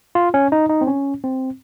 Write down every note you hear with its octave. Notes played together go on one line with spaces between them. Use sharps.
F4
C#4
D#4
D#4
C4
C#4
C4